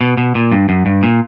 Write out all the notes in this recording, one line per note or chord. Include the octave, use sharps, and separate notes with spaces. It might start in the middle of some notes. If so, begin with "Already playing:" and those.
B2
B2
A#2
G2
F#2
G2
A#2